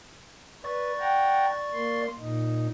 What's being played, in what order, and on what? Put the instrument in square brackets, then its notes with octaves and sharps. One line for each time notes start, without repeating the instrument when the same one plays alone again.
[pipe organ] B4 [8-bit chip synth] D5 C#6 A6
[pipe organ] F#5 G5 A#5
A#3 C6
A#2 D#4